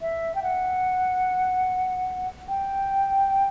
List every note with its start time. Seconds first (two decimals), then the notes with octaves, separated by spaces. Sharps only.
0.01 E5
0.35 G5
0.43 F#5
2.48 G5